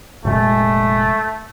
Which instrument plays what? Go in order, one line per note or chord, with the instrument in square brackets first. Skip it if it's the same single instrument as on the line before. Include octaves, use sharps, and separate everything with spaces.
[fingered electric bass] F1 A#2 G#3 [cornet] A3